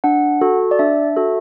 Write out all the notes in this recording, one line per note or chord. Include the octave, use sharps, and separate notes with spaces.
D4 F#5
F#4 A4
D5
D4 E5
F#4 A4